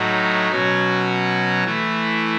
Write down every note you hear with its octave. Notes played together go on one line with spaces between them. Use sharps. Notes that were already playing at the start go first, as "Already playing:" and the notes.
Already playing: A2 F#3 A3 D#4 F#4
B2 F#3 C#4 F#4
E3 A3 E4